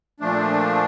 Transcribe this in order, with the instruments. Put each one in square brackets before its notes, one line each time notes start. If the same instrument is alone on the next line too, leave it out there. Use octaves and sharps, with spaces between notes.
[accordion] A#2 F3 A3 D4